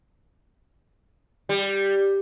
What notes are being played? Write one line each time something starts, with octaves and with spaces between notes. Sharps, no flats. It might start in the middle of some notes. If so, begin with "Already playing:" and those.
G3